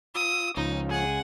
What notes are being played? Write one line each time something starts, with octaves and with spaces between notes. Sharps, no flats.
F4 D#6 E6
C#2 F3 C#4 D#4
G#4 F#5